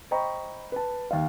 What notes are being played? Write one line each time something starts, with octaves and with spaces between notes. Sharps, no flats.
C5 D#5 G5 A#5 B5 C#6
B4 A5
D#2 F5